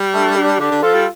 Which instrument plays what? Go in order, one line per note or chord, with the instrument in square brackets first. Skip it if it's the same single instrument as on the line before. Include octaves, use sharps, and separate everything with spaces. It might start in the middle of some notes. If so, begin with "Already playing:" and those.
Already playing: [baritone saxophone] G3
[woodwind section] A3 D4
A4
D4 G4
[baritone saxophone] D3 [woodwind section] D4 G4
[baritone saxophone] D3
[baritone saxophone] F3 [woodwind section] F4 A4
[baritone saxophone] G3